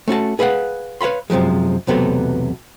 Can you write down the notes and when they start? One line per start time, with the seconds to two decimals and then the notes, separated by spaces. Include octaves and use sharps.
0.08 A3 C#4 F#4 A5
0.39 G#4 B4 D#5 F5 F#5
1.01 B4 C#5 F5 B5 C6
1.30 F#2 C3 F3 F#3 G#3
1.87 B1 E2 C3 F#3 A3 B3